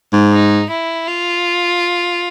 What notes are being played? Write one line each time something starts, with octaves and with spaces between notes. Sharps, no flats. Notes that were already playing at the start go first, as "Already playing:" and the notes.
G#2
D#4
E4
F4